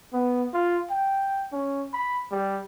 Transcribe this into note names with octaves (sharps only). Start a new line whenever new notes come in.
B3
F4
G5
C#4
B5
G3